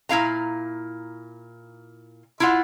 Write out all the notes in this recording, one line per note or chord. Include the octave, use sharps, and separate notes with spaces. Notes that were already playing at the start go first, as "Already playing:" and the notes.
A#2 E4 F5 A#5
E4 F4 F#5